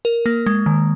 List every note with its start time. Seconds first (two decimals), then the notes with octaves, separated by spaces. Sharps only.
0.05 A#4
0.26 A#3
0.46 G#3
0.66 D#3